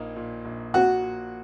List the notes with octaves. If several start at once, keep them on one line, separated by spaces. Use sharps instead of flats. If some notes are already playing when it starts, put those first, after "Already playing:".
Already playing: A#1 A#2 A#3 D#4
A#2
A#1
A#3 F#4
A#2